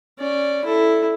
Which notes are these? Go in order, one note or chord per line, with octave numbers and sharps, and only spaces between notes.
C#4 D5
E4 A4